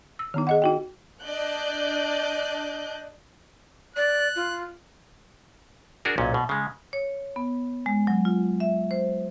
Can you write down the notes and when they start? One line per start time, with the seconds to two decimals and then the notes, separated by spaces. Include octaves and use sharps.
0.19 E6
0.34 D#3 B3 D#4
0.47 G#4 D#5 F#5
0.62 D#4 F#4 G5
1.24 D4 D5 D#5 F#6 G6
3.96 D5 F#6
4.36 F4
6.05 D4 F#4 G#4 A#4
6.18 B1 A#2 C#4
6.34 B2
6.49 C#3 G#3
6.93 C#5
7.36 B3
7.86 G#3
8.07 F#3
8.25 F4
8.60 E5
8.91 C5